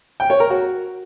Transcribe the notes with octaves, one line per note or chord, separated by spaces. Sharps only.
G5
C#5
A#4
F#4